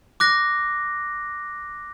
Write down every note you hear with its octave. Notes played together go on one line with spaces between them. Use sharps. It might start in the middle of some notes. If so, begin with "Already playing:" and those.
D6 F#6 A#6